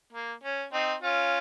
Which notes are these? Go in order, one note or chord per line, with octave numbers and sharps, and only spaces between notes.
A#3
C#4
C4 D#4
C#4 F4